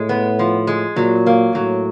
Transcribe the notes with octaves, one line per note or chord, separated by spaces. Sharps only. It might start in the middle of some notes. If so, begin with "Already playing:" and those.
Already playing: A2 G#3
B3
F3
G#3
A#2 F#3
A#3
A2 F#3